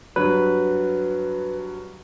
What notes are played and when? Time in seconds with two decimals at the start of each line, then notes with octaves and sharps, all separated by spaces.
0.16 G2 F#3 B4